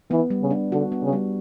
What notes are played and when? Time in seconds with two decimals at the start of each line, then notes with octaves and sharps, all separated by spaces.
0.11 E3 B3
0.30 G3
0.41 C#3
0.51 D4
0.72 D3 F#4
0.92 B3
1.03 C#3
1.13 G3